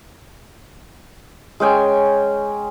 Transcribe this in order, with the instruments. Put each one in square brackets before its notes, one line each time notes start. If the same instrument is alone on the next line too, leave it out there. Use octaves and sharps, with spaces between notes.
[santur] G#3 C#4 G5 G#5